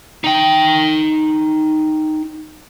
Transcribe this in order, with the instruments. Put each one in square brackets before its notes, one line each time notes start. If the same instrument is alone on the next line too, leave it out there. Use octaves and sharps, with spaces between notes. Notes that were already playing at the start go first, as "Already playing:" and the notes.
[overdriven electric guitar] D#4 G5